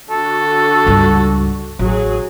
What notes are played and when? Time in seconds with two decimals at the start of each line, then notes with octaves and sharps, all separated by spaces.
0.11 D3 F#4 A4
0.87 C#2 G2
1.79 A1 F#3 G#4